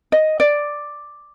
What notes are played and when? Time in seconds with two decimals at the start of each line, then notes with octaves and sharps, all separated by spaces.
0.12 D#5
0.40 D5